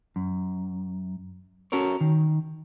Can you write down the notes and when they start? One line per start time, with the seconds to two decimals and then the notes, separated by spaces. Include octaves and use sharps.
0.16 F#2
1.72 C#4 F#4 A4 A#4 C#5
2.01 D#3